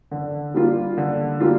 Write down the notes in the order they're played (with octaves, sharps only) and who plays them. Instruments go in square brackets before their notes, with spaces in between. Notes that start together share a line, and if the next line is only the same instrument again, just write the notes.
[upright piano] D3
G3 A#3 F4
D3
G3 A#3 F4